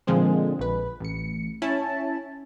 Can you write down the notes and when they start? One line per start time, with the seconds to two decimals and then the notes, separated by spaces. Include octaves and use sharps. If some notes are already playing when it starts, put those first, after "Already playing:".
0.07 A#2 D3 F3 G#3 C4
0.59 A#1 B4
1.00 A1 C#7
1.62 C#4 E4 A5